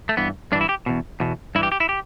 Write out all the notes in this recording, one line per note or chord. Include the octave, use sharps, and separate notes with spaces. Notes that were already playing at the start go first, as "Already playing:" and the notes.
A3
G2 E3 B3
G2 E3 D4
E4
G4
E2 B2
E2 B2
G2 E3 E4 G4
G4
E4
G4